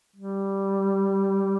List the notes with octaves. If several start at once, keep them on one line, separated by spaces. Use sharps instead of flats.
G3